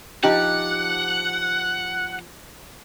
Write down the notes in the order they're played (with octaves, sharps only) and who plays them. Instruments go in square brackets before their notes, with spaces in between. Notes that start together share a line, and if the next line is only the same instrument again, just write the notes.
[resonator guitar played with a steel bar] F3 D#4 G4 [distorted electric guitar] F#5